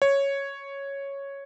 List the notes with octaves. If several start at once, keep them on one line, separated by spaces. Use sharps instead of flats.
C#5